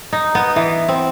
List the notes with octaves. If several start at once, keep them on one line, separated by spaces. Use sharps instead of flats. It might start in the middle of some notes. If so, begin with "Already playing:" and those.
D#4
B3
E3
C4